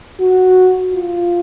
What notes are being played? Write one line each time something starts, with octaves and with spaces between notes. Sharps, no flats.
F#4
F4